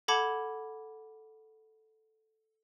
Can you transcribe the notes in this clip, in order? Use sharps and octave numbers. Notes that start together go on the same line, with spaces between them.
A4 F#5 A5 B5 D6 G#6